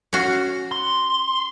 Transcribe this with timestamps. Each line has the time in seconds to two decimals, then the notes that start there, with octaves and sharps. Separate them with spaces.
0.13 C#4 F#4
0.72 C6